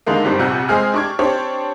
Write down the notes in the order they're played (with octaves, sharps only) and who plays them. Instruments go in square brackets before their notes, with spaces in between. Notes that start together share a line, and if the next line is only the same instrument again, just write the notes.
[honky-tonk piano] D3 D#3 G#3 A#3
G1 G2 G3 C4 D4
A#1 F2 C3 F#5 E6 G6
G#3 C4 G#4 F6
D4 G4 C#6 D6 G#6
C4 D4 G4 C5 C#5